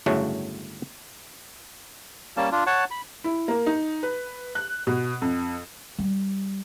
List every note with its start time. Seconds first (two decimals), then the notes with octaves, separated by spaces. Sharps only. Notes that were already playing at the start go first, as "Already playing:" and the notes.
0.06 G1 A2 C#3 F#3 A3 F#4
2.37 G3 A#3 C#4 A5
2.52 D4 F4
2.67 C#5 F#5 A5
2.91 B5
3.24 E4
3.48 A#3
3.66 D#4
4.03 B4
4.55 F#6
4.87 B2
5.22 F2
5.98 G3